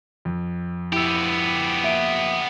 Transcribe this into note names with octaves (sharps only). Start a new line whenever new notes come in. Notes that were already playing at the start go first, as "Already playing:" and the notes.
F2
B3 E4 G4 E6
A#3 E5 D7